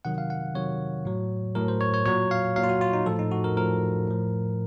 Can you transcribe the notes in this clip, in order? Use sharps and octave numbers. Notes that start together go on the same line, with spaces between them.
C3 D#3 F#3 F#5
F5
F#5
C3 D#3 F#3 C#5
A2 F#3
A2 F#3 A#4
C5
C#5
C#5
A#2 F#3 C#5
F5
A#2 F#3 F5
F4
F#4
F4
D#4
A2 F3 A4
D#4
F#4
A#4
A2 F3 A#4
A2 F3